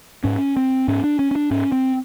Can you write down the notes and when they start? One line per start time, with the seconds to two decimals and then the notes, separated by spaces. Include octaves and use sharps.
0.24 G#2 C#4
0.57 C4
0.88 G#2 C#4
1.04 D4
1.19 C#4
1.31 C#4
1.36 D4
1.51 G#2 C#4
1.72 C4